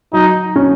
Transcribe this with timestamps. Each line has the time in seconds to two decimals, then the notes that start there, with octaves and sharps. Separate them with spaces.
0.13 F#3 D#4
0.56 C#4